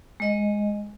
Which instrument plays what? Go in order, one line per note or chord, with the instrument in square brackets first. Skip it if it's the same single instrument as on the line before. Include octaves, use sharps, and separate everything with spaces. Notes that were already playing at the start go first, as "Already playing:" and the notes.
[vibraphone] G#3 D#5